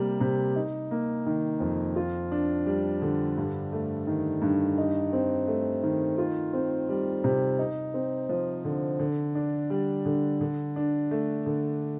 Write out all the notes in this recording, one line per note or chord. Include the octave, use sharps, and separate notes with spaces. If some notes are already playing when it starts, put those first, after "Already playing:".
Already playing: C3 G3 A#3
C3
D#4
A#3
D#3
F2
F4
D4
G3
D3
G2
A3
D#3
G2
D#4
C4
A3
D#3
F4
C4
G3
C3
D#4
C4
F3
D3
D3
D4
G3
D3
D3
D4
A3
D3